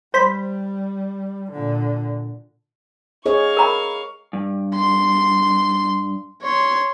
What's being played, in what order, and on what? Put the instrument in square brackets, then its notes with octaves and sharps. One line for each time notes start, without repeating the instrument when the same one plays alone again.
[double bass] G3 [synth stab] C5 B5
[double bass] A#2 D3
[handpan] G#4 C#5 D#5 [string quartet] F5 C#6
[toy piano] A#4 A#5 B5
[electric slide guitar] G2
[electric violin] C6
C#5 C6